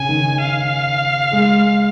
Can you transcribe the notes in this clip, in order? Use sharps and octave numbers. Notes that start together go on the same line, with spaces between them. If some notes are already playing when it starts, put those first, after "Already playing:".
Already playing: C#3 G#5
D#3
F5
G#3